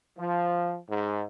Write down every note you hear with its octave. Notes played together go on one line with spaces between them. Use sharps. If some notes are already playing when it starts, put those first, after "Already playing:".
F3
G#2